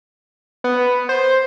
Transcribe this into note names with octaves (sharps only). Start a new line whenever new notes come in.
B3
C5